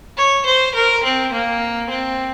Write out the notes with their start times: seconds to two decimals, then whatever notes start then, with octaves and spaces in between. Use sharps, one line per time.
0.17 C#5
0.46 C5
0.75 A#4
1.04 C4
1.32 A#3
1.90 C4